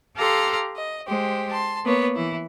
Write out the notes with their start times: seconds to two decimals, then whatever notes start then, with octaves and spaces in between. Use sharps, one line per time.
0.15 G4 A4 F5 A#5 C6
0.76 D#5
1.08 G#3 G4 C5
1.50 A5 C6
1.83 A#3 B3 C#5
2.15 E3 E4